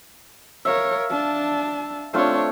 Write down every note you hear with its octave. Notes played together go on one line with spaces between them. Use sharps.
A#4 C#5 E5 F5
D4 A5
A3 C4 D4 F4 C#5